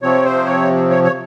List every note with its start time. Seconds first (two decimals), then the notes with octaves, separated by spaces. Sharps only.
0.02 C3 F3 C4 C#5
0.25 C5
0.46 C#5
0.90 C#5
1.04 C#5